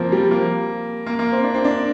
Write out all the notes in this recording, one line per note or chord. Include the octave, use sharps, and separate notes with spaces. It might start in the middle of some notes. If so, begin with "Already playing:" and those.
Already playing: F3 A#3 C4
G3
A#3
A#3
A#3
C4
D4
C4
D4